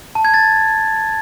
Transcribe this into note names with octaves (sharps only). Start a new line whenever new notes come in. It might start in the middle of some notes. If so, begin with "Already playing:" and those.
A5
G#6
A6